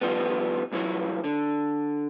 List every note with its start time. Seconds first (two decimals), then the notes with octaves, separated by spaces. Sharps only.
0.01 D#3 F3 G3 B3
0.72 C2 A#2 E3 F#3 C#5
1.24 D3